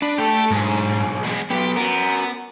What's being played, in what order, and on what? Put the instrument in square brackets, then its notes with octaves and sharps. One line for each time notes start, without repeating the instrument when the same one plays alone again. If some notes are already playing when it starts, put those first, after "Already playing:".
[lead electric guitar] D4 [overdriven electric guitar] B4
[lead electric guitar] A3 A4 [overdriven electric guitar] G4
[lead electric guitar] B1 G#4 [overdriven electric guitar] G#2
[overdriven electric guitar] G#3 B3
[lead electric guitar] F#3 B3 [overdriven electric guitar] G4
[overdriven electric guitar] B3 [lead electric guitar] F#4 A#4